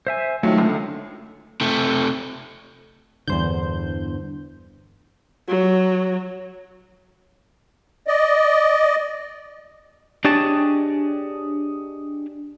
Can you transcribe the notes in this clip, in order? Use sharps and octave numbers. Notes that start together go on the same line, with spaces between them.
C5 E5 G#5
D#3 F#3 A3 F4
C#2 D3
C3 A3
E2 G2 D3 C5 G6
F#3
D5 D#5
D4 G4 G#4 C#5 D#5 A5